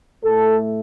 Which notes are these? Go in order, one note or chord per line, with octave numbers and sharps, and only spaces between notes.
A2 A3 A4